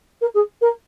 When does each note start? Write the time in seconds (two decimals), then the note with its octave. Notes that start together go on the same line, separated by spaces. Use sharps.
0.21 A#4
0.34 G#4
0.61 A#4